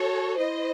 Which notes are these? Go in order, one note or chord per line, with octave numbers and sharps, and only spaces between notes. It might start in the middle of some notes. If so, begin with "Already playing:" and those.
Already playing: F#4 A4 C#5
E4 C5 D#5